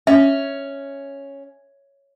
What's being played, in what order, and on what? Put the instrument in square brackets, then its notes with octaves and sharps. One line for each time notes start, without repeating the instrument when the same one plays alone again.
[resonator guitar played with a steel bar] C#4 [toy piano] E5